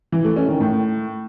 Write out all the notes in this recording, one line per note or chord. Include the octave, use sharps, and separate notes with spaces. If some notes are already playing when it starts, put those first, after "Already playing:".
E3
A3
C#4
D#3
A2